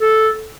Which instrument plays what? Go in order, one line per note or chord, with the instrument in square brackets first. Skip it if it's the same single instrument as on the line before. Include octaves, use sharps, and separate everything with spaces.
[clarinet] A4